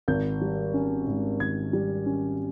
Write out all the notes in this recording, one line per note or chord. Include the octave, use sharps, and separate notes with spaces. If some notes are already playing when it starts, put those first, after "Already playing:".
G#1 G6
G3
C#4
G#2
G#1 G#6
G3
C#4